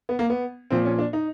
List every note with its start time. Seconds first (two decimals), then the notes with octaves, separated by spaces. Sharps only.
0.09 B3
0.19 A#3
0.30 B3
0.70 A#2 F3 C4
0.85 C#4
0.99 D4
1.13 D#4